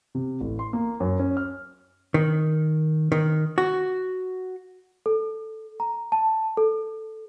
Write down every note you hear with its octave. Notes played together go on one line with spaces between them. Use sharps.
C3
A1
C6
A#3
F#2
C#4
F6
D#3
D#3
F#4
A4
A#5
A5
A4